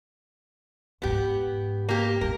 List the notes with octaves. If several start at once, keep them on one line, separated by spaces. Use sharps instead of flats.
E1 G#2 B3 G4
A#3 G4
E2 A#2 A#4